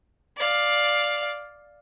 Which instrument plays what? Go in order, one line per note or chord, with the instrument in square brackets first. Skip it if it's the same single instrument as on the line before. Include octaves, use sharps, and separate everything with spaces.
[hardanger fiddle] D5 F5